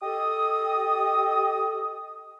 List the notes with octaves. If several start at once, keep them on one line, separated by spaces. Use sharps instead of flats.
G4 A4 D#5 D#6